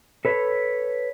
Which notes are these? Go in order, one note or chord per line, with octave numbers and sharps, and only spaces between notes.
A4 B4 C#5